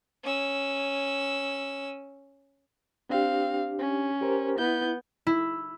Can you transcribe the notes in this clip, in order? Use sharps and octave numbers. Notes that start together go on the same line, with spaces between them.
C#4 E6
C4 D4 G4 F5
C#4
G4 A#4 C5
B3 E4 G6
E4